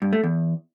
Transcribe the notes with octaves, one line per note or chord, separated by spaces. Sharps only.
G2
A3
E2